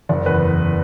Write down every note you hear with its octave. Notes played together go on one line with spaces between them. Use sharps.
F#1 D5
E2 B4